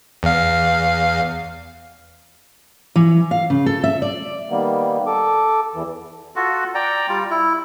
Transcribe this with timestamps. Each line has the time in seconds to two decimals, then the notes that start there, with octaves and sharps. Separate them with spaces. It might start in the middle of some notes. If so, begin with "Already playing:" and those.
0.23 E2 F5
2.96 E3
3.31 F5
3.50 C#3
3.66 A4
3.84 E5
4.02 D5
4.50 D#3 G3 A#3 B3
5.07 A4 D6
5.75 E2 E3
6.36 F4 F#4 A4
6.75 D5 G5 A#5
7.09 G3 F4
7.30 E4